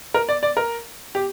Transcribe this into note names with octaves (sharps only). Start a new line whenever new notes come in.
A#4
D5
D5
A#4
G4